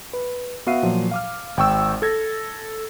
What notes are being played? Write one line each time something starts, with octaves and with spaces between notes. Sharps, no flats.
B4
B3 F#4 E5 F5 C7 D#7
A#2 F3 F#3
F5 D6 F6
G#1 G5 C#6 E6
A4 G#6 A#6